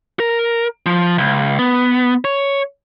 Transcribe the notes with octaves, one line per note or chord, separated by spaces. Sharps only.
A#4
F3
C#2
B3
C#5